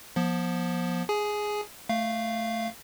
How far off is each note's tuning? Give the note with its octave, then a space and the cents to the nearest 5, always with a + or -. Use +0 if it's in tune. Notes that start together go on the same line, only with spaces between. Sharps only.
F3 +15 B3 -35
G#4 +0 G#5 +20
A3 +0 F5 -10